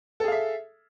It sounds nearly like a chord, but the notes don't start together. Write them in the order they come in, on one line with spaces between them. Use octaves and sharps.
A4 G#4 F5 E5